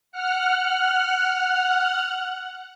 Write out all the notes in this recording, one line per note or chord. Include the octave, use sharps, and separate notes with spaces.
F#5 F6 F#6